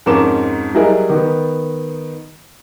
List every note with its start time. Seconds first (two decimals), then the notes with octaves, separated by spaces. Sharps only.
0.06 F2 G#2 C#4 A#4 D6 E7
0.75 F#3 G3 E4 G#4 A#4 D#5
1.09 D#3 B3